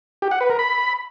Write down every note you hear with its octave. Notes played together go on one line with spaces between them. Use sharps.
G4
F#5
B4
A#4
B5